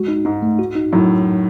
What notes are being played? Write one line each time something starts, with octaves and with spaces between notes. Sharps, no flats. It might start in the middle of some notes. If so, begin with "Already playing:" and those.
Already playing: G#3 F#4
D#4
G#2 D#4
A3
F#4
D#4
F#2 A2 F#4
D#4
D#4